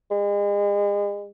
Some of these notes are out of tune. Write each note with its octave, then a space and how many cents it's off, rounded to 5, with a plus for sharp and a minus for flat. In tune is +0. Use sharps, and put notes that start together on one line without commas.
G#3 -35